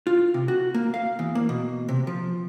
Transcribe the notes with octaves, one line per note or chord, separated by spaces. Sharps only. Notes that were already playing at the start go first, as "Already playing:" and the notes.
F4
C3
F#4
A#3
F5
E2
A#3
B2
C3
F3